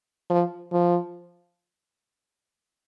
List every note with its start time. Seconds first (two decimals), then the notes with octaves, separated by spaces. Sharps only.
0.30 F3
0.72 F3